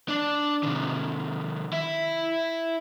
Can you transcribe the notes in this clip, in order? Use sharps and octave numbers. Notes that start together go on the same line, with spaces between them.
D4 D5
C3 D#3
E4 E5